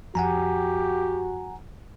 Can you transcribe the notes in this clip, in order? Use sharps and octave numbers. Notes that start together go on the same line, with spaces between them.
F2 F#4 G4 F#5 G#5 A#5